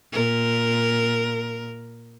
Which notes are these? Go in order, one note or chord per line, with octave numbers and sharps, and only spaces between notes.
A#2 A#4